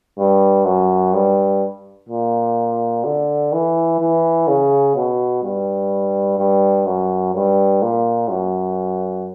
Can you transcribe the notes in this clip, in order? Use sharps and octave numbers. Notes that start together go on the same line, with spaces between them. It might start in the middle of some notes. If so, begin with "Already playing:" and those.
G2
F#2
G2
A#2
D3
E3
E3
C#3
B2
G2
G2
F#2
G2
A#2
F#2